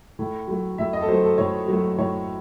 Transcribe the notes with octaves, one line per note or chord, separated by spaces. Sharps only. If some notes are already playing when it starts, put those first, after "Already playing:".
A2
F#3 A3
A2 E5
D#5
A4
F#3 A3 C5
A4
A2 C#5
F#3 A3
A2 C#5